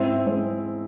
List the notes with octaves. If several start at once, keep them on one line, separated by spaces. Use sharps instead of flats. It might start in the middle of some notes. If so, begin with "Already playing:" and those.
Already playing: G#2 C4 E4
G#3 C4